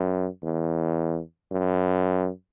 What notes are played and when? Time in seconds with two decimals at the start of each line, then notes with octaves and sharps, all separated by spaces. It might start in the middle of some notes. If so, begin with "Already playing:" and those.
Already playing: F#2
0.43 E2
1.52 F#2